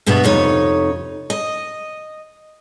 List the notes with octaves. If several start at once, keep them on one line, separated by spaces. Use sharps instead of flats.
D2 G2 B2 B3 F#4 E5
F2 C3 D#4 C#5
D#5